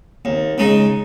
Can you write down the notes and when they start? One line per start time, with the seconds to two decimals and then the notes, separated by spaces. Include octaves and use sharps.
0.25 D#2
0.58 C#3 G#3 D#4